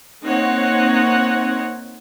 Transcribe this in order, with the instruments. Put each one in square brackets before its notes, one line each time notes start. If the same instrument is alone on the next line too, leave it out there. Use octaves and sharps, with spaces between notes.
[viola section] A#3 C4 D#4 C#5 F#5